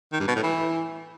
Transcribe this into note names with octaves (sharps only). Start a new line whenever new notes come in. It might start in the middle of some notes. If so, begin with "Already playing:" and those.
D#3
G2
B2
A2
E3